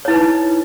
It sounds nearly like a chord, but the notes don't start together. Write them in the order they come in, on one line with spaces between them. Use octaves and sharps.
C#5 E4 B4 D#4